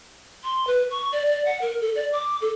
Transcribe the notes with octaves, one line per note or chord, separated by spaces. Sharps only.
C6
B4
C#6
D5
D5
F#5
A#4
A4
D5
D6
A4